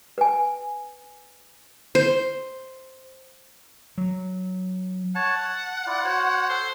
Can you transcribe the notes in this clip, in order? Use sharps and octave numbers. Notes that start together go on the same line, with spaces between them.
B4 G#5
C5
F#3
C#5 F#5 A5
A5
E4 F4 D5
F#4 C5 C#5
A4 C5